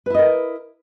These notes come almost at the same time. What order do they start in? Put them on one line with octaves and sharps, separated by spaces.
B4 E4 D#5 A#4